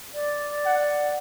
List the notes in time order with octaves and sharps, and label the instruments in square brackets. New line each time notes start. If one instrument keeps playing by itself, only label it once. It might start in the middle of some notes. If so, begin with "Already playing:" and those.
[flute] D5
[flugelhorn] F#5